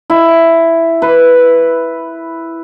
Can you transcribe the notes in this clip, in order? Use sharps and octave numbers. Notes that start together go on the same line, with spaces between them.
E4
B4